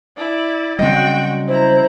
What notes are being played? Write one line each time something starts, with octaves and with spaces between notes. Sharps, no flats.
E4 D5
C#3 F#3 G3 C4 F#4 D#5 G5
E4 C5 A#5